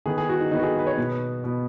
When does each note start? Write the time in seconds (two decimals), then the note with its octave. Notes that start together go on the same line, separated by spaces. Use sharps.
0.06 D#3 B3 G#4
0.18 G#4
0.29 F#4
0.40 D#4
0.51 D#3 B3 D#4
0.59 F#4
0.63 G#4
0.79 B4
0.87 C#5
0.98 B2 B3
1.44 B2 B3